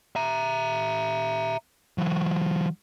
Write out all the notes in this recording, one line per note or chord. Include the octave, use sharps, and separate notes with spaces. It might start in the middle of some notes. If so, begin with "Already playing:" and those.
E5 A#5
E3 F#3